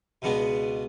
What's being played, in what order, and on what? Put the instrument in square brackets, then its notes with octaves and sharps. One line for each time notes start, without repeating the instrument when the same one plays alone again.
[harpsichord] C#2 B2 G#3 B3 D4